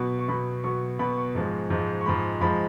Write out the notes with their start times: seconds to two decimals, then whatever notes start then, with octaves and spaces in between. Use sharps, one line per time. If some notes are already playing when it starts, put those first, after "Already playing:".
Already playing: B2 F#3 B3 B5
0.19 C#6
0.28 B2 F#3 B3 B5
0.64 B2 F#3 B3 C#6
0.99 B2 F#3 B3 B5
1.17 C#6
1.35 G#2 F3 G#3
1.70 G#2 F3 G#3
2.01 C#6
2.06 G#2 F3 G#3 B5
2.41 G#2 F3 G#3 B5